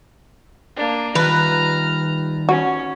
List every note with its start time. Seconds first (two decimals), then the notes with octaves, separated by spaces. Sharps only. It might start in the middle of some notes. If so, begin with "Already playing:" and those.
0.75 A#3 D4
1.15 D#3 G3 F4 B4 A#5 F6
2.49 C#4 F#4